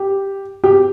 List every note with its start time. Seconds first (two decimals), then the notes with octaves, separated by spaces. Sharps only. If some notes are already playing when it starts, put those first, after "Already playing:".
Already playing: G4
0.64 G4